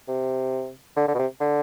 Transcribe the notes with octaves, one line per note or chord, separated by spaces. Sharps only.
C3
D3
D3
B2
C3
D3